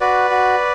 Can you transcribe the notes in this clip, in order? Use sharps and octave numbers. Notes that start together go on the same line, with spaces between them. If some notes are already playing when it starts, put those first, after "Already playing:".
F#4 B4 D5
F#4